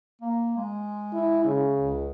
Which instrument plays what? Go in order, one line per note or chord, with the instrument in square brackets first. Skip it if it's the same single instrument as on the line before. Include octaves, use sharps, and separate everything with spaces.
[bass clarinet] A#3
G#3
[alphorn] E4
C#3
[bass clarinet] C#2